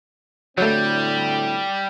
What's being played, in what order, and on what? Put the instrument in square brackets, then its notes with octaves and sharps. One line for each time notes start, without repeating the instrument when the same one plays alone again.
[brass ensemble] D2 A2 C4 [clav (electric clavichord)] F#3 A3 [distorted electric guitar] G3